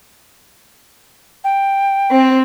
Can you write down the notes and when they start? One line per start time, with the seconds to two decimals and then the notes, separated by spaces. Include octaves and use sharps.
1.44 G5
2.11 C4